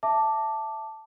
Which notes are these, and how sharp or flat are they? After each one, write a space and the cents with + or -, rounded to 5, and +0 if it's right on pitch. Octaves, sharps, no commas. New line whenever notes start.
E5 +0 A5 +0 D6 +0